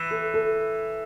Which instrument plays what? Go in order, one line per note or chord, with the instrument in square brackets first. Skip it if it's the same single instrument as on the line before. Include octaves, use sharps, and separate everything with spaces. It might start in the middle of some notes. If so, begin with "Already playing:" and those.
Already playing: [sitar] E3
[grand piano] A4
A4